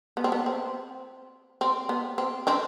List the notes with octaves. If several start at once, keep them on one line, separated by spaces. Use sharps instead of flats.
B3
C4
B3
C4
C4
B3
C4
C4 D4